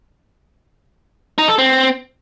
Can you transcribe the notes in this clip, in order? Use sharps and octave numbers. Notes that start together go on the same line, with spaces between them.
D#4
A4
C4